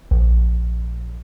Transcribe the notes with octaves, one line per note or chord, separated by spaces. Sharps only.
A#1